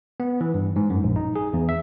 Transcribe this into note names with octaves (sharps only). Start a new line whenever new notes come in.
B3
E3
G2
G#2
F#2
A#1
D#4
G#4
E2
E5